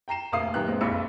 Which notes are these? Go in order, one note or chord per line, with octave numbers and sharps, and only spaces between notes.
G5 A#5 C7 E7
F1 D2 A#3 F5 D#6 C7
F#2 D#3 A#3 B3 G4 F#6
A#1 G#3 C4
F#1 B1 F2 B5 E6 C#7